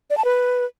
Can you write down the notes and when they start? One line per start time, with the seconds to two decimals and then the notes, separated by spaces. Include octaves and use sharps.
0.10 D5
0.17 A5
0.25 B4